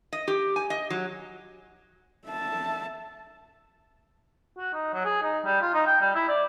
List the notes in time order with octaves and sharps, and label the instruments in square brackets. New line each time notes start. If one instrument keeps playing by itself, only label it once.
[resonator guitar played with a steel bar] D#5
G4
G#5
D#5
F#3
[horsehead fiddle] E5 A5
[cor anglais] F#4
D#4
F#3
G#4
D#4
G3
F4
D#4
G5
G3
E4
D5